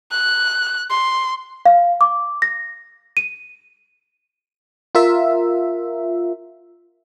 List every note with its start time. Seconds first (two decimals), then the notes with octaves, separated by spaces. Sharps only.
0.12 F#6
0.90 C6
1.66 F5
2.01 D6
2.42 A#6
3.17 D#7
4.95 F4 A#4 E5